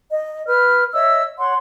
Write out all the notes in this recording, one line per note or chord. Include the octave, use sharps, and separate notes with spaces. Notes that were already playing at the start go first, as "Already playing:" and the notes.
D#5
B4 F6
C#5 D#5 E5 E6
C#5 F#5 C6